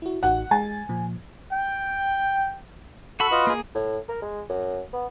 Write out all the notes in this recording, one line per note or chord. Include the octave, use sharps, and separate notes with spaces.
E4 F#4
A1 D#4 F#4 F#5
G#3 G#5 A6
A#2 F3
G5
F#4 A4 B5
F4 B4 D#5
A#3 G#4
A2
A#4
G#3
F#2
B3